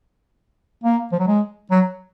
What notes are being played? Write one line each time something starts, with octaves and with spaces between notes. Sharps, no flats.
A#3
F3
F#3
G#3
F#3